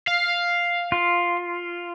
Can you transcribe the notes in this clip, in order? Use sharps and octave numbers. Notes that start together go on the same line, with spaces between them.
F5
F4